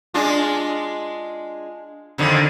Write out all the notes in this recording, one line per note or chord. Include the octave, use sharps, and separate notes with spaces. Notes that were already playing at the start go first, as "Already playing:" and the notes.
G#3 D4 F4
F2 D3 D#3